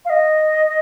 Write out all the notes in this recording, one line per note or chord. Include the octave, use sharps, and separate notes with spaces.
F5
D#5